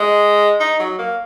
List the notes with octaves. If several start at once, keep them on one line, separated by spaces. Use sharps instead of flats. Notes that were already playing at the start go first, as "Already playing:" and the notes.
Already playing: G#3
D#4
F#3
A#3